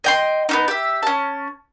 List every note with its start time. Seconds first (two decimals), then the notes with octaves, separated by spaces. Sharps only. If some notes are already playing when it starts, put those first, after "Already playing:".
0.04 D#5 G5 C6
0.49 B3 C#4 D#4
0.68 G4 E5
1.03 C#4 A5